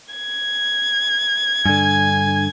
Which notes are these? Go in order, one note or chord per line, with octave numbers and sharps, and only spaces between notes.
G#6
G2 D3 G#5